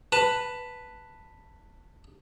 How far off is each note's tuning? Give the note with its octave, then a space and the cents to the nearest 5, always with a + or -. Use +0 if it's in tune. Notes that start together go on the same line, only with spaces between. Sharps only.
B4 +0 A5 +15